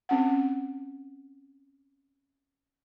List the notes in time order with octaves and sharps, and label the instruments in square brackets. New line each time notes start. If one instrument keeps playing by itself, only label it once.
[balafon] C4 C#4 F#5